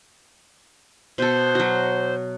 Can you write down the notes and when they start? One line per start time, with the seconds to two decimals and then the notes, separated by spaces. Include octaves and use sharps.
1.18 B2 A4 C5
1.55 F#3 F#4